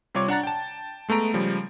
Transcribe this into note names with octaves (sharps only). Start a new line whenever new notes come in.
C3 G3 F4 C#5 D6
D4 F#5 A#5 A6
G5 A5
G#3 A3 B3 A#5 D7
C#3 F3 G3